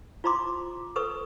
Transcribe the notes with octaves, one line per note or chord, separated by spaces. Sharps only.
F4 C5 A#5 C6 D6
A4 B4 C5 C#6 D#6